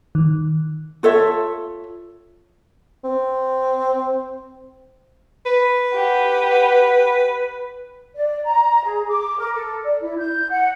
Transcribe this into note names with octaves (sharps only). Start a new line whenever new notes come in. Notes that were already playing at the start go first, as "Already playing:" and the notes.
D#3
F4 A4 C#5 E5
C4
B4
G4 F#5
D5
A#5
G#4
D6
A#4
A4
D5
E4
G6
F#5